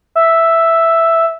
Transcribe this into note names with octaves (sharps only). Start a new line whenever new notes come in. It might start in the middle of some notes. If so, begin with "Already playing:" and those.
E5